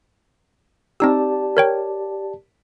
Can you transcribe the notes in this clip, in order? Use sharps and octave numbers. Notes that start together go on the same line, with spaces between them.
C4 D#4 G4 D5 A5 E6
A#4 C#5 G5